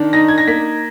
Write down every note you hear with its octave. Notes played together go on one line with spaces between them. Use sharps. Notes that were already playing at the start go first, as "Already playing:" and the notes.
Already playing: D#3 D4
D#4 A#6
G#6
A#6
A#3 B6